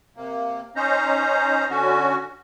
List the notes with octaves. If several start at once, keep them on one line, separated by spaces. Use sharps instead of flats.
C3 A#3
C#4 D#4 C5 A#5
D3 C#4 F#4